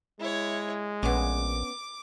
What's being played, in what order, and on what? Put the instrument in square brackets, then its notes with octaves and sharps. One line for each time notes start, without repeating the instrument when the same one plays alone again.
[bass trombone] G#3 [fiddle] E4 C#5
[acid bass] A#1 [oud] B3 C#4 [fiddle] D6